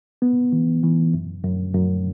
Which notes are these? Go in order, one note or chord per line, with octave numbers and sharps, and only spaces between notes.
B3
E3
E3
F#2
F#2
F#2